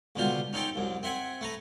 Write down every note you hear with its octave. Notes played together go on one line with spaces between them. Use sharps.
C#2 B2 D3 G3 F4 C5
C#4 D#4 A4 C5 G5
C2 F#2
C4 E5 F#5 G#5
A3 B4 A#5